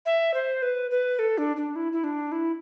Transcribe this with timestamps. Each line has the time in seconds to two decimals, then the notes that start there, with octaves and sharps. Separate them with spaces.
0.06 E5
0.34 C5
0.62 B4
0.91 B4
1.19 A4
1.38 D4
1.57 D4
1.76 E4
1.92 E4
2.04 D4
2.32 E4